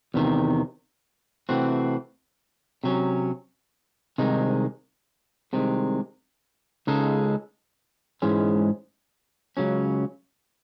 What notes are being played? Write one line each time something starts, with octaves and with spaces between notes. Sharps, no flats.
E2 C3 D#3
C3 E3 A3 C4 F#4
C3 F#3 C#4
C2 C3 D#3 G#3 D#4
C2 C3 D#3 G#3
C#2 C#3 G#3 D#4 A4
G#2 E3 G#3 C#4
C#2 C#3 F#3 C#4